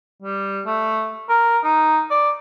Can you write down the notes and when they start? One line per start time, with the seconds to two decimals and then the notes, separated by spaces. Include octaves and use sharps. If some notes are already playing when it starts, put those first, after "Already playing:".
0.22 G3
0.66 A3
1.29 A#4
1.64 D#4
2.11 D5